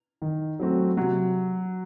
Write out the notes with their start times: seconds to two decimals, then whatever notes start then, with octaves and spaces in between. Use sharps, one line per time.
0.22 D#3
0.59 F#3 A3 C4 F#4
0.97 C3 F#3